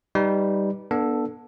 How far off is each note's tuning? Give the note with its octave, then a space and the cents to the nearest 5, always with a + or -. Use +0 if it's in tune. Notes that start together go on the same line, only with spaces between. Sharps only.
G3 +0 D#4 +0 B4 +0
B3 -30 D4 +10 A4 +0